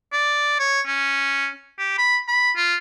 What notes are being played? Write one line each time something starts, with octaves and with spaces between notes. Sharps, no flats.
D5
C#5
C#4
G4
B5
B5
F4